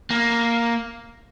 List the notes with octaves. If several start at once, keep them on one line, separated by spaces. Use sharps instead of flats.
A#3